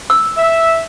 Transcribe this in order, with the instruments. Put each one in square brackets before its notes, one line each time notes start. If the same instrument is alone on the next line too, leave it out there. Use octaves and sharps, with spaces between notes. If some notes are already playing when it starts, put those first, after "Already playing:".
[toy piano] E6
[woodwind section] E5